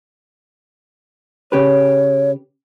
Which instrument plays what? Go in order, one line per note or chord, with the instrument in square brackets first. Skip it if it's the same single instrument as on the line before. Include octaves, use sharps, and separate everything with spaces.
[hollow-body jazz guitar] C#3 G4 B4 [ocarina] C#5